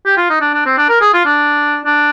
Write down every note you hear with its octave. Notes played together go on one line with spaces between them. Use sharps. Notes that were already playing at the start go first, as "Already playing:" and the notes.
G4
F4
D#4
D4
D4
C4
D4
A#4
G#4
F4
D4
D4